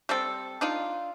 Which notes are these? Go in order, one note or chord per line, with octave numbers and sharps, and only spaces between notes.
G3 C4 A4
D4 D#4 F4